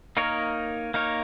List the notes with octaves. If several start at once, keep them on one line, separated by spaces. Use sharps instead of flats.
A#3 D#4 A#4 C#5
A#3 D#4 A#4 C#5